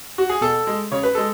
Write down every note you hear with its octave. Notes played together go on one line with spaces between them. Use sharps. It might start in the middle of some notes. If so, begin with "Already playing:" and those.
F#4
G#4
B2 A4
G#3
C#3 C#5
B4
G#3 A4